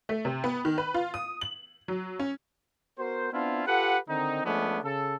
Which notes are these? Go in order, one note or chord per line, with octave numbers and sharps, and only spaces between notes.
A3
C3
B3
D#3
B4
F4
D#6
F#7
F#3
C#4
B3 F#4 A#4 C5
B3 C4 D4 E4 F4
F4 G4 A4 B4 F#5
D3 D#3 C4 D#4
F3 G#3 A3 B3 C#4 D4
C#3 A4